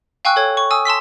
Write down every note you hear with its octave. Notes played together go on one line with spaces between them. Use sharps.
F5 G5 G#5 C#6 E6 F#6
A4 C#5 G#6
C#6
G#5 D#6 E6
A5 C6 E6 B6